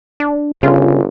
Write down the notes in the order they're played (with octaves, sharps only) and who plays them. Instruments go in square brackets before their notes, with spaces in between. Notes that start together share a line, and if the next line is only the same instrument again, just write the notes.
[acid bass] D4
[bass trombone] G1 [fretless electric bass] C#3 [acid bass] F4